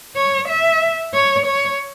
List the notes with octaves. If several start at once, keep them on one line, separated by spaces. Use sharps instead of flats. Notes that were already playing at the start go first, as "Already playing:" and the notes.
C#5
E5
C#5
C#5